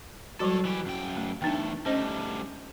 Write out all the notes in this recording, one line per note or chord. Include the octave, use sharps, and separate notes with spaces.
F#3 G3 F#4 A4 C#5
E3 G4
F#2 G5
A3
E2 A3 D4 D#4 G5
G3 A3 C#4 C5 D#5